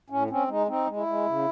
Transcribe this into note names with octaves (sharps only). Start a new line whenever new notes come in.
A2 C#4
C4 C#4
G#3 D#4
C4 D#4
G#3
E4
G#3
C#3